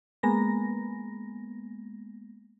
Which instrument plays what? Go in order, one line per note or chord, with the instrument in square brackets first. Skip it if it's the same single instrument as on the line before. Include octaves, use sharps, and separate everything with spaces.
[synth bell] G#3 A#3 B3 A#6